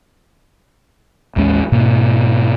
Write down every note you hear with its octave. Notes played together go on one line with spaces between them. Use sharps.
A1 D#2 G#3 C#4
G#2 B2 A#3